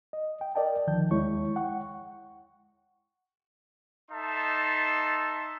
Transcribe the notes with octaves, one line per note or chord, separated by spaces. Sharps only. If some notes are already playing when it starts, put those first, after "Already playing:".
D#5
G5
A#4 D5 D#5 G5 A5
C#2 D3 D#3 F3 A5 G6
D#2 G#3 E4 C#5 C#6
F#5 G5 C#6
D#4 A4 E5 A5 C6